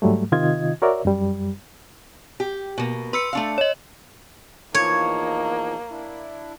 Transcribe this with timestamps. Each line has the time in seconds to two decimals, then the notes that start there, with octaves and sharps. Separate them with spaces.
0.02 G#2 F#3 G3 A3
0.32 C3 D#3 F4 D#5 G#6
0.82 F#4 A#4 C#5 D5 E5
1.05 F#2 G3
2.40 G4
2.78 B2 A#3
3.13 B4 C6 E6 C#7
3.33 A3 D4 F5
3.58 C#5 D#5
4.74 E2 F3 A#3 D#4 C#5 G#6
5.91 D4 E4